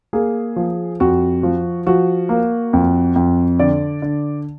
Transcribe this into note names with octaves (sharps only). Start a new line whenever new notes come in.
A#3 G#4
F3
F2 F#4
F3
F3 F#4
A#3
F2
F2
D3 D5
D3